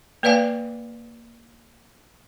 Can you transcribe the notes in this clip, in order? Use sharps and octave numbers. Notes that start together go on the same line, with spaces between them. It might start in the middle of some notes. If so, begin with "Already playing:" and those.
A#3 B4 D5 F5 G#5